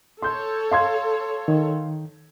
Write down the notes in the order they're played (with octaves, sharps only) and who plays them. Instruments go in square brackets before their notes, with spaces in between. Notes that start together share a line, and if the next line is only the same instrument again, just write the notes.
[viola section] A4 C#5 [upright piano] C6 G6
[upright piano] F5 C6 G#6
[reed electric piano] D#3